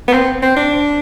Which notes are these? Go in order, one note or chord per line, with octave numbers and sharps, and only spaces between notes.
B3
C4
C4
D4